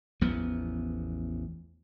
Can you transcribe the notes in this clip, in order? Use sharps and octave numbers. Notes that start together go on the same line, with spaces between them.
A1 E2 F3 B3